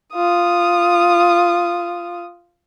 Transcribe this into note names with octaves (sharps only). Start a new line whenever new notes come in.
F4 D#6